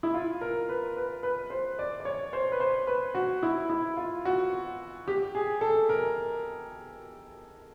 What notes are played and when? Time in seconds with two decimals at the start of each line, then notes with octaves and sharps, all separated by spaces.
0.03 E4
0.14 F4
0.41 A#4
0.69 B4
0.97 B4
1.23 B4
1.50 C5
1.79 D5
2.00 D5
2.05 C#5
2.33 C5
2.52 B4
2.60 C5
2.87 B4
3.15 F#4
3.43 E4
3.69 E4
3.97 F4
4.25 F#4
5.08 G4
5.35 G#4
5.61 A4
5.89 A#4